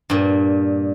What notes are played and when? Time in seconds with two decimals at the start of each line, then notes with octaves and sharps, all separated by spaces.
0.10 G2 A#2